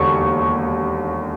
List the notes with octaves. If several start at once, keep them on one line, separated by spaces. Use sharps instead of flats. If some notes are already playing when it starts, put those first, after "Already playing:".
Already playing: E1 D#2 D3 C#6